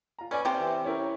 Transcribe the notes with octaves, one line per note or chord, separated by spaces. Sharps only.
F4 A#5
C#4 B4 D5 G#5
C3 C4 G4 C5
E3 E5
C#4 E4 A#4